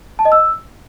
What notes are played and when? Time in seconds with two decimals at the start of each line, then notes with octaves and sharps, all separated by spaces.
0.19 A5
0.25 D#5
0.32 E6